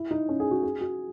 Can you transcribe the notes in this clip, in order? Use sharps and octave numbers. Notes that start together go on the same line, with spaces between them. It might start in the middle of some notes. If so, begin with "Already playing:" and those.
Already playing: E4
D#4
C#4
G#4
F#4
G#4
F#4